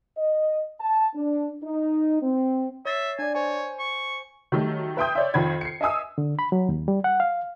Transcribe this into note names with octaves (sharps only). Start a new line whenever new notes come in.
D#5
A5
D4
D#4
C4
C#5 E5 A6 C7
D4 D5 G#5
C5 C#5 G#5
C#6
D#3 F#3 G3 A3 D#4
B4 E5 G5 C6 D#6 G6
C#5 D5 E5
F2 D#3 B5 G#6
C7 C#7
D#5 E5 G#5 D#6 E6
D3
B5
F#3
D#2
G3
F#5
F5